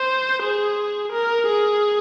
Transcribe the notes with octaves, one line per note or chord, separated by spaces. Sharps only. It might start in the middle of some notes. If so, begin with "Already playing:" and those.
Already playing: C5
G#4
A#4
G#4